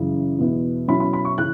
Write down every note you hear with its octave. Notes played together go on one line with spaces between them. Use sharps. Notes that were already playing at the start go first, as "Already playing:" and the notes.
Already playing: F#2 C#3 E3
E2 B2 B3 E4
B2 F#3 C#4 E4 B5
B5
B5
C#6
C#3 E3 C#4 F#6